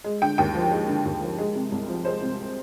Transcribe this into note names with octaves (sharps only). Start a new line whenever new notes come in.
G#3
D3 G5
D#2 G5
F3
G#3
D3
D#2
F3
G#3
C3
C2
F3
G#3 C5
C3